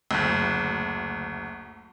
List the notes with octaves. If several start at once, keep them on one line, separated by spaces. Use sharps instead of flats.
F#1 D2